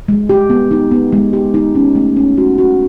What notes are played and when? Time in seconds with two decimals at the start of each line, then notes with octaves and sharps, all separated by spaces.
0.08 G#3
0.29 G4
0.50 B3
0.71 D#4
0.91 B3
1.12 G#3
1.33 G4
1.54 D#4
1.75 C#4
1.95 A3
2.17 C#4
2.38 F#4
2.58 F#4